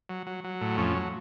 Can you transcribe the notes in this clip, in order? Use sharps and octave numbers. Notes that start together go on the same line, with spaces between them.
F#3
F#3
F#3
A2
F2 C#4
F#3